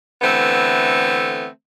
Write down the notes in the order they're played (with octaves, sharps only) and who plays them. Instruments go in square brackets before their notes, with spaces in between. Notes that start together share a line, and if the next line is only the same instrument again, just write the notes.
[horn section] D3 E3 A3 B3 C4